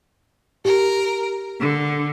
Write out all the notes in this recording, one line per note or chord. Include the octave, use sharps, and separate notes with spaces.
G4 A#4
D3